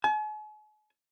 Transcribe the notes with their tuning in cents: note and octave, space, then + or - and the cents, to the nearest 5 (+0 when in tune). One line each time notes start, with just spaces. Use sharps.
G#5 +45